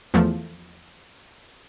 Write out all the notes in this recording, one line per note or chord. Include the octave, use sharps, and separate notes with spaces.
E2 F3 A3